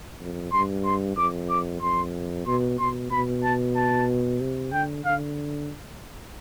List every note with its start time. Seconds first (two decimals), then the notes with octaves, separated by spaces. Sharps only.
0.21 F2
0.53 G2 C6
0.85 C6
1.17 F2 D6
1.50 D6
1.81 F2 C6
2.46 B2 C6
2.79 B2 C6
3.11 B2 B5
3.44 A5
3.76 A5
4.41 C3
4.72 D3 G5
5.05 D3 F5